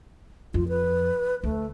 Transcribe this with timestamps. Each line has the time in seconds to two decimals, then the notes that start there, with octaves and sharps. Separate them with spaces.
0.54 F2 F4
0.69 B4
1.44 D2 A3